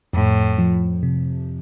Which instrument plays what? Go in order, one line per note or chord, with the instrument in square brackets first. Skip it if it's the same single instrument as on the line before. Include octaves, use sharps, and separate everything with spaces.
[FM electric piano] F2 [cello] A2
[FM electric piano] F3
C3